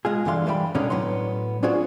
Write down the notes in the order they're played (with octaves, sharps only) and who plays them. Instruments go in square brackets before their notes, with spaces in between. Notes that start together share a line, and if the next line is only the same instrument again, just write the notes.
[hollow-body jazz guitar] G#3 F4 G#4
G2 D3 E3 F5 C6
E3 G3 B4 C5 G5 B5
G2 B2 D3 D#3 C#4 D#4
A2 F#3 B3 C6
C#4 D4 F4 F#4 G#4 C5